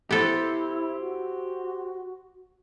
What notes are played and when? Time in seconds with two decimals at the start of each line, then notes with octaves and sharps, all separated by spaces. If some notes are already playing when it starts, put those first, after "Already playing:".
0.11 B3 E4 G4 A4 C5
1.00 F#4